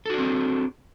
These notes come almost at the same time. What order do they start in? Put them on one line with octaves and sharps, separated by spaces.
A4 F#4 D4 C4 G#4